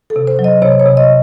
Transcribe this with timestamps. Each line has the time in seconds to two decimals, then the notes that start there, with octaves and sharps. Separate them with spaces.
0.10 A4
0.16 C3
0.27 C5
0.39 F#3
0.44 D#5
0.62 C3 C#5
0.80 C#5
0.86 C3
0.97 D#5